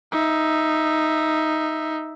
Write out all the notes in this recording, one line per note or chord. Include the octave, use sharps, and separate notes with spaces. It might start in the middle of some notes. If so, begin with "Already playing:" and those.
D#4 E5